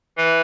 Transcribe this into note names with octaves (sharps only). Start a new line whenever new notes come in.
E3